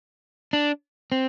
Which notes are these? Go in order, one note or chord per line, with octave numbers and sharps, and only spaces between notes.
D4
C4